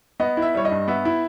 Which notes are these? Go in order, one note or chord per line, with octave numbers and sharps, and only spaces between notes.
B3 D#5
E4
E5
G3 C#5
D#5
G2
B3 E5
E4